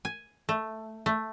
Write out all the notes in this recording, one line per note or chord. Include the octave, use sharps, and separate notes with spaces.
G#5
A3
A3